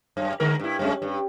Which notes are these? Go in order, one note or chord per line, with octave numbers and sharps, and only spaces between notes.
F#2
D3 G#3 A#4
G2 E4
F#2 G#3 C#4
G2